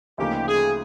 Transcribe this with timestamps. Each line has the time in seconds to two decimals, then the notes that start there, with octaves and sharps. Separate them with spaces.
0.18 D2 C#3 F3 A#3 D#4 G4
0.48 G#4